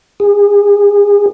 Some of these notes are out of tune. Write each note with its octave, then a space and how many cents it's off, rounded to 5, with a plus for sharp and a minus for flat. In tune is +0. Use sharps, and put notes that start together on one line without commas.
G#4 -30